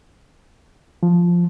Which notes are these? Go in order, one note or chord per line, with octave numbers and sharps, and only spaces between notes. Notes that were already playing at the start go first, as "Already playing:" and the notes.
F3